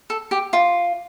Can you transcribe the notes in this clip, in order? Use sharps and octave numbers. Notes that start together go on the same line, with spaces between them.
A4
G4
F4